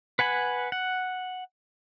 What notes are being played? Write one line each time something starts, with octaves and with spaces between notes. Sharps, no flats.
B4 F#5 G#5 B5
F#5